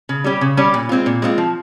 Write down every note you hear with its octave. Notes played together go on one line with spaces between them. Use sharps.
C#3
G3 C#4 G4
C#3
G3 C#4 G4
A#2
G#3 C4 F4
A#2
G#3 C4 F4
F3